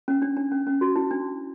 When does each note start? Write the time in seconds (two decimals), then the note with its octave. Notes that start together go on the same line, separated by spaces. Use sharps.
0.08 C#4
0.22 D4
0.37 D4
0.52 C#4
0.67 C#4
0.81 F#4
0.96 E4
1.11 D4